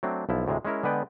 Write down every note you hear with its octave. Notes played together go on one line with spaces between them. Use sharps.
F#3 A3 C4 D4
B1 F3 E4
D2 A2 C3 G#3
G#3 C#4 E4 A#4
D3 G#3 B3 B4 D5 G5